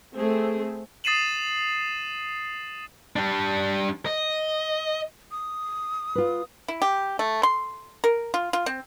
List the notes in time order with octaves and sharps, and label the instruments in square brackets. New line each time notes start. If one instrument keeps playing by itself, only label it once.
[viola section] A3 C4 G#4
[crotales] D#6 A6 C7 D#7 E7 F#7
[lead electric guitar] G3 D4
D#5
[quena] D#6
[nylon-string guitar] F4 B4
[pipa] E4
G4
A3
C6
A#4
F4
F4
C4